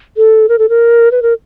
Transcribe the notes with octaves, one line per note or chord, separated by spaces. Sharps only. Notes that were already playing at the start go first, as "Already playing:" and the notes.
A4
A#4
A4
A#4
B4
A#4